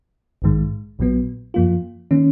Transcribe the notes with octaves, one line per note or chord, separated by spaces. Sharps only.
A#1 G#2 D#3 G#3
A#1 A#2 F#3 B3
F#2 F3 A#3 F4
D#3 A#3 C#4